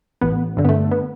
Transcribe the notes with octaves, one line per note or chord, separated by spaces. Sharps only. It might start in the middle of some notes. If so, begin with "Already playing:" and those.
A1 B3
G2 D3
B3
A3
B3